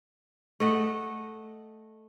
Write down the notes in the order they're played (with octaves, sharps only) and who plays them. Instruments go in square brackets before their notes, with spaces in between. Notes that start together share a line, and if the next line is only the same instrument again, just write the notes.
[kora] A3 D#5 F#5